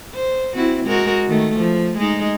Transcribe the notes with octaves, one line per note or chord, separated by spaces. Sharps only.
C5
C4 E4 F#4
G#3 F#4 A#4
D#3 A3
F3
G#3 D#4